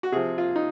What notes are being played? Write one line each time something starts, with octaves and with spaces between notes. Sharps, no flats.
F#4
C3 F3 G#4
F4
D#4